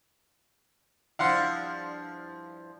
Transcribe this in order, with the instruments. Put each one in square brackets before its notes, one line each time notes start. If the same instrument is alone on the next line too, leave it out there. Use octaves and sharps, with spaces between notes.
[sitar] G2 F3 E4 [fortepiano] F5 F#5 C6